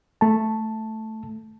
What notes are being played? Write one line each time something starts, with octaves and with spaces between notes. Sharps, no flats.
A3 A5